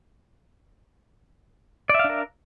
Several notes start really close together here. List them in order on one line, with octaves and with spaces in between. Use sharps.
D5 E5 F5 D4 A#4